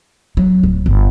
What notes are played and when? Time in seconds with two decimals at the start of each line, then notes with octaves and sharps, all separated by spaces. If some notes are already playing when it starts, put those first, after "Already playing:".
0.37 F#3
0.63 D1
0.86 G1